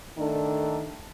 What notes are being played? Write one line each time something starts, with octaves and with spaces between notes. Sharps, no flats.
D#3 A3 D4 A4